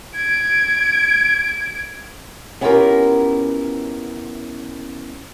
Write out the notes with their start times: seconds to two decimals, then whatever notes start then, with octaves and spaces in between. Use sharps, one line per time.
0.16 G#6 D7
2.61 B3 C#4 E4 F4 G4 A#4